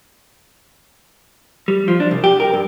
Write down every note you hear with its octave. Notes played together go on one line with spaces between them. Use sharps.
G3
F3
D4
C2
G4
A#4
G2